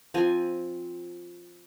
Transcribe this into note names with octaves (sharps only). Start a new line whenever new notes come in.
F3 C4 G#5